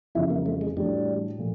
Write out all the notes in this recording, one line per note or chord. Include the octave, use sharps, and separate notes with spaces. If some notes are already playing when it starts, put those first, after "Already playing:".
F2 C#3 E3 G3 C4 E4
A#3
A3
G#3
A2 E3 G3 A3 D4 F#4
A#2 F3 A3